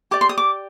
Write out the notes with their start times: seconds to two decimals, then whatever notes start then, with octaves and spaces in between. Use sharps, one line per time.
0.11 G4 D5 D6
0.21 C6
0.29 D#6
0.38 D6